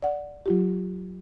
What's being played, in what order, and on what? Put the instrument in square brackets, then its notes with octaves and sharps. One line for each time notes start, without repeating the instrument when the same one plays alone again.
[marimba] D5 F#5
F#3 F4 G4